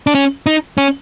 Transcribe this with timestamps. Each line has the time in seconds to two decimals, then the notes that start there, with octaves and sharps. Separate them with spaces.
0.07 D4
0.15 C#4
0.46 D#4
0.78 C#4